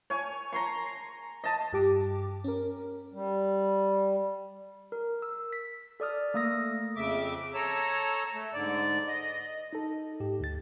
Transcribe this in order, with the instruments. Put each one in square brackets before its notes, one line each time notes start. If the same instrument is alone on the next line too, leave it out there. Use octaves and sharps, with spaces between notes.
[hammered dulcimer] C#5 G#5
A#5 C6 C#6
D#5 A5
[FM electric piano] G2 G4 D6
C#4 A#4
[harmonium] G3
[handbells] A#4
E6
B6
A4 D5 D#6 F6
A3 A#3 D#6 E6 A#6
[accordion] F2 C#3 E5 D6
A4 C#5 A#5 E6
A3
G#2 D3 D5
D#5
[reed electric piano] D#4 A4
[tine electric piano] G#2 G4
D2 A6